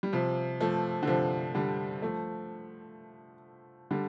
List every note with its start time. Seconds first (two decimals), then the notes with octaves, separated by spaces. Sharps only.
0.03 G3
0.13 C3 F3
0.61 F3 A3
1.03 D3
1.07 C3 F3
1.55 D3 G3
2.02 F3 A3
3.91 D3 G3